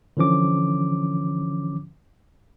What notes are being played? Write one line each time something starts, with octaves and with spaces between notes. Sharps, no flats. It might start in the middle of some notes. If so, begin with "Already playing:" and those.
D3 E3 F3 C#4 D6